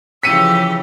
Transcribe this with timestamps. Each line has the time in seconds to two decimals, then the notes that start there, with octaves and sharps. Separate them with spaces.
0.23 C#3 E3 F3 G4 E6 B6 C#7 D#7